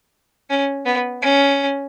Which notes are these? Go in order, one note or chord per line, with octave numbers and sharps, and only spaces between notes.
C#4
B3
C#4